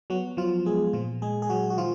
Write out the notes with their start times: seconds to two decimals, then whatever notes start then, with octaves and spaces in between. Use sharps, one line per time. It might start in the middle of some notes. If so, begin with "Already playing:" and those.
0.10 F#3 B3 F#4
0.37 F3 F#3 F4
0.65 G#3 B3 G#4
0.93 A#2 F3 F4
1.22 A#2 G#3 G#4
1.42 G#4
1.50 F#3 G#3 F#4
1.70 F#4
1.77 D#3 F3 F4